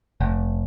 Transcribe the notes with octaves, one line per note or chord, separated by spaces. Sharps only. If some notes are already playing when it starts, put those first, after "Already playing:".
F1